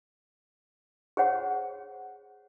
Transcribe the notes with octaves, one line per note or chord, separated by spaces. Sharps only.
G#4 C5 C#5 F#5